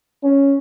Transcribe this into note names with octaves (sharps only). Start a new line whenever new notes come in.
C#4